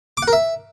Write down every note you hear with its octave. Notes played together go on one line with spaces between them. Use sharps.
D6
F#5
A#4
E5